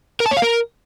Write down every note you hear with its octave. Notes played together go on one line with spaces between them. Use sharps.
A#4
A5
C#5
F5
A#4